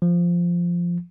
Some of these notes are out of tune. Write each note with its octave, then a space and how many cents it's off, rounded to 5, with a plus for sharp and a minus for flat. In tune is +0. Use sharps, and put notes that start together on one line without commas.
F3 -5